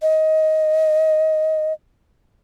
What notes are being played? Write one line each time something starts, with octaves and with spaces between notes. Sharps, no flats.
D#5